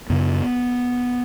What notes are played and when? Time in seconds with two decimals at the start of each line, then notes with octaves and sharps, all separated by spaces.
0.10 F#2 C#3 B3